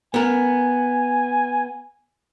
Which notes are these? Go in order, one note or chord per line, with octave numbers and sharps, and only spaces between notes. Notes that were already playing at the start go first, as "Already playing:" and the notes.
B3 A#4 G#5